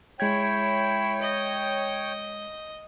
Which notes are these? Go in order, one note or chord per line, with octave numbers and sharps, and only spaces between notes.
G#3 E4 C#5 G5 G#6
D#5